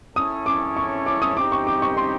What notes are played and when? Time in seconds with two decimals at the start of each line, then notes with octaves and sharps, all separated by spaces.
0.16 C#4 E4 A4 C#5 D#6
0.46 D6
0.77 C#6
1.06 D6
1.22 D#6
1.37 C4 D#4 G4 D6
1.52 C#6
1.67 D6
1.82 C#6
1.97 C6